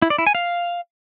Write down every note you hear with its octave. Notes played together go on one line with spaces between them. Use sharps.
E4
D5
E4
G#5
F5